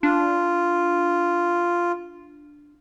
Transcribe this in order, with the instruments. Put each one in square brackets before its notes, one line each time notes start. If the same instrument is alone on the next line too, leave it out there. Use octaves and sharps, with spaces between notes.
[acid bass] D4 [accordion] F4